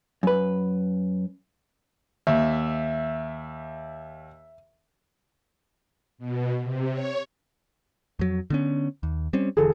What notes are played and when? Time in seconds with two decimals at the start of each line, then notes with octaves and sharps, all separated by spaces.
0.23 F#2 B4
2.27 D#2 E5
6.18 B2
6.62 C3
6.92 C#5
8.19 F2 F#3
8.50 D3 B3 C#4
9.03 D#2
9.33 G3 C4 C#4
9.57 E1 D3 E3 G#4 A4